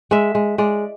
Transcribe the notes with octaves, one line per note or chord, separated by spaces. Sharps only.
G#3 E5
G#3
G#3 D5